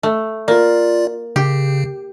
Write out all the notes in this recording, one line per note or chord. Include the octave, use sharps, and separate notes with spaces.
A3
A#3 F4 D5
C#3 G4